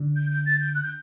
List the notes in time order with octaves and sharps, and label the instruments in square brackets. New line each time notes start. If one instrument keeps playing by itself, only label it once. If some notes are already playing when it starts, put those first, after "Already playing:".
Already playing: [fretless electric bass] D3
[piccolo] G6
G6
A6
G6
F#6
G6